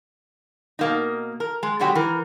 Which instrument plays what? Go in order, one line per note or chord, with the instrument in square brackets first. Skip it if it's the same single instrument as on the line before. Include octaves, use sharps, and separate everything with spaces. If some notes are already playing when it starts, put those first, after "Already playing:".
[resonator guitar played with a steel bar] B2 A#3 D#4
A#4
G#3
B2 D3 F#3 G#3 F#4 G4
E3 A#4